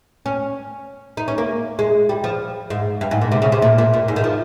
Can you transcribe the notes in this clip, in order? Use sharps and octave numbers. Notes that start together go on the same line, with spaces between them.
C#4
D#4
C#4
A#3
G#3
G3
F3
G#2
G2
G#2
A#2
C3
C#3
C3
A#2
A#2
A#2
G#2
D#3
F3